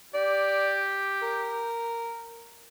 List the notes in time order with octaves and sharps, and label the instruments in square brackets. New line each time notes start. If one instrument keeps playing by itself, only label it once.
[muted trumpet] G4 [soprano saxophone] D5
[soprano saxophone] A#4